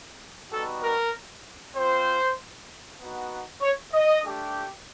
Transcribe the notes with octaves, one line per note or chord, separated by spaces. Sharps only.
G3 B3 D#4 F#4 A4
A#4
C4 F4 C5
B3 D#4 F#4
C#5
D#5
A3 D4 G4